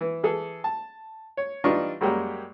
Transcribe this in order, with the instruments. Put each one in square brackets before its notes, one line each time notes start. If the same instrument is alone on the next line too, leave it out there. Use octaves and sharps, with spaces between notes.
[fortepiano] E3
E3 G#4 A4
A5
C#5
E3 G3 D4 D#4 F4 C#6
F#2 G3 G#3 A#3 G4 C#5